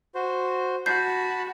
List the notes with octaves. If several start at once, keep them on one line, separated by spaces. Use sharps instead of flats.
F#4 C5
F#4 A5 B5 G6 C7